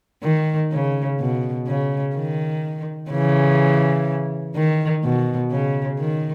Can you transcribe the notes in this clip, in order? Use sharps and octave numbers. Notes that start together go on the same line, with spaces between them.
D#3
C#3
B2
C#3
D#3
C#3 E3
D#3
B2
C#3
D#3